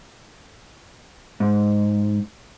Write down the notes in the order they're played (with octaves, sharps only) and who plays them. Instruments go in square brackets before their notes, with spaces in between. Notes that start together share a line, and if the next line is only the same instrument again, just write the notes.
[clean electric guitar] G#2